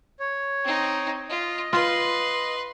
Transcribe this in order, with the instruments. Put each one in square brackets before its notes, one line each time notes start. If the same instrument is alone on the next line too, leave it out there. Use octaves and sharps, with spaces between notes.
[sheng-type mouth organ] C#5
[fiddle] C4 D#4
[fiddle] F4 [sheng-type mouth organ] D#5
[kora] F4 [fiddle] B4 C6